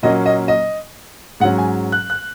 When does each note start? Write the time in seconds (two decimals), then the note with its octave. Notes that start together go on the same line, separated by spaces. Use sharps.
0.03 A#2 F#3 A#3 C#4 D#5
0.26 D#5
0.48 D#5
1.40 G#2 F#3 C#4 F#5
1.58 G#5
1.92 F#6
2.10 F#6